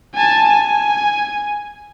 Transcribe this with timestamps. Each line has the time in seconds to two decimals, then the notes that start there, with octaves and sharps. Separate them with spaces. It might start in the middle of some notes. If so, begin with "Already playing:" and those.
0.15 G#5 A5
0.49 G#5